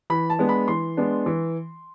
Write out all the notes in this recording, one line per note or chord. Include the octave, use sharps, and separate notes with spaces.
E3 B5
A5
G#3 B3 D4
B5
E3 C6
G#3 B3 D4
E3